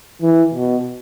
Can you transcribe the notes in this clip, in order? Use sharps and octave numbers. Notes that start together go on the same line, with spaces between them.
E3
B2